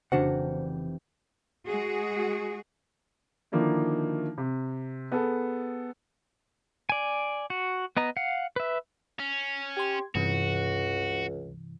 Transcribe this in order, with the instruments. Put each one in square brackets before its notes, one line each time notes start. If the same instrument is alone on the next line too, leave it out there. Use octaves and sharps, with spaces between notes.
[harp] F1 E3 G5 [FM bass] C#3 [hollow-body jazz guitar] D4 F#4 F#5 [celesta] C5
[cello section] G#3 F#4 G#4
[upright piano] D3 D#3 F3 A#3 D4 E4
C3
B3 G#4 A4
[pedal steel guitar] D5 G#5
F#4
B3 D#5 A#5
F5 F#5
B4 E5
[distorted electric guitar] C#4
[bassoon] G4 [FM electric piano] C6 G#6
[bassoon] C#2 [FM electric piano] G2 C3 E3 [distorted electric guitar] F#4